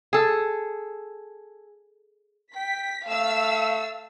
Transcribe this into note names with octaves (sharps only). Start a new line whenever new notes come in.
G#4 A4
G5 B6
A3 F5 E6